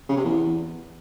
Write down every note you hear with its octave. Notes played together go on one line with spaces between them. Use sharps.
C#3
C3
E2